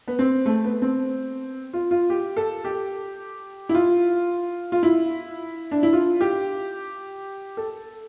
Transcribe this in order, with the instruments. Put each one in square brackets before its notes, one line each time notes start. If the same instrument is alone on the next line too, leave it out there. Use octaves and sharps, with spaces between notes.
[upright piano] B3
C4
A3
B3
C4
F4
F4
G4
A4
G4
E4
F4
F4
E4
D4
E4
F4
G4
A4